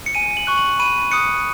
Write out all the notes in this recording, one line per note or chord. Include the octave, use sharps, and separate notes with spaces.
C#7
G#5 D#7
F#7
C#6 F#6
F#7
B5 D#7
D#6 F#6 C#7